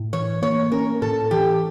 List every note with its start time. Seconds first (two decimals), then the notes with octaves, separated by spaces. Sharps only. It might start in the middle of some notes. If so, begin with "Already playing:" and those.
Already playing: A2
0.13 E3 C#5
0.42 A#3 C#5
0.72 C#4 A#4
1.02 A2 A4
1.31 E3 G4